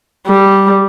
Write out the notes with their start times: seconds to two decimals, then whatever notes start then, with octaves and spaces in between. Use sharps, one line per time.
0.27 G3